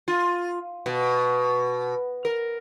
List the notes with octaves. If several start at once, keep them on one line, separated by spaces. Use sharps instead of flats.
F4
B2
A#4